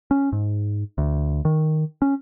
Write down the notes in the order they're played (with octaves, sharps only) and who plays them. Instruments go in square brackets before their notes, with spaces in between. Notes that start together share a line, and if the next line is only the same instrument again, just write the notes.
[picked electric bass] C#4
G#2
D2
D#3
C#4